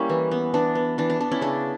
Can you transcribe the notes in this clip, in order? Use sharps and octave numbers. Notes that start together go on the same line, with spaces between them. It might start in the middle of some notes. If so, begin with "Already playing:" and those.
Already playing: G3 A#3 C#4 E4
E3
B3
E3 D4
B3
E3 D4
D4
B3 D4
C#4 E4
C#3 D4